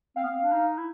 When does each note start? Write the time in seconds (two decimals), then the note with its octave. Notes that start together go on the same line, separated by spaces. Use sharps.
0.16 C4 F5
0.23 B3
0.30 C4
0.43 D4
0.52 D#4
0.77 E4